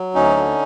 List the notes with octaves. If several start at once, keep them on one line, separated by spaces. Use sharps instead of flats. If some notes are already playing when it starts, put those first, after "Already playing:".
Already playing: F#3
D2 C#4 D#4
D3